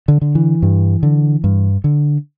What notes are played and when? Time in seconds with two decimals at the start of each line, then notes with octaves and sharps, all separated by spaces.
0.08 D3
0.21 D3
0.35 E3
0.62 G2
1.03 D3
1.44 G2
1.84 D3